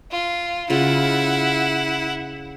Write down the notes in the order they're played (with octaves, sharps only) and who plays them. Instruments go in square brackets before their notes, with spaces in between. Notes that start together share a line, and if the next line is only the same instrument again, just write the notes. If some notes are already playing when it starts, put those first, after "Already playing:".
[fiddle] F4
[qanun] C#3 F4 [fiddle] E4 F#5